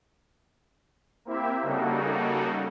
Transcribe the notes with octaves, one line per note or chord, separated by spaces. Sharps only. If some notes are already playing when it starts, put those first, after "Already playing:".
A#3 C4 E4 G4 E5
C#3 G3 A#3 D#4 F#4 A4